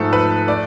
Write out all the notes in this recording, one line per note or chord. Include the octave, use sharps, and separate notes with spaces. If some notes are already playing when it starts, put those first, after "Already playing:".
Already playing: G#2 F3 A3 A4
B4
A3 D5